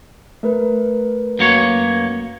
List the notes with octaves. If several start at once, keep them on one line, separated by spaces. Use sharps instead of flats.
A3 A#4 B4
F#2 A#3 C#5